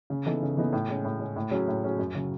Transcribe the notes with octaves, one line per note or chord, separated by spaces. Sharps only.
C#3
E3 B3 D#4 A4
C#3
E3 B3 D#4 A4
A2
G#3 C#4
A2
G#3 C#4
A2
F#3 C#4 G#4
A2
F#3 C#4 G#4
F#2
C#3 F#3